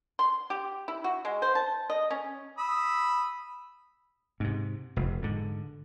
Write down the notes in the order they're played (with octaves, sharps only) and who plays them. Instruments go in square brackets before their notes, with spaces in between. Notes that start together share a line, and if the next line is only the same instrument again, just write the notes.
[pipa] C6
G4
E4
F#4
G#3
C5
A5
D#5
C#4
[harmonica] B5 D#6 E6
[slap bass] G#2 C3
F1
G#2 D3